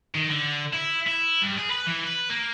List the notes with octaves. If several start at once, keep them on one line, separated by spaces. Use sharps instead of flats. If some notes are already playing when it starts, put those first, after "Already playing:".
D#3
D3
E4
E4
G2
G#4
B4
E3
B4
A#3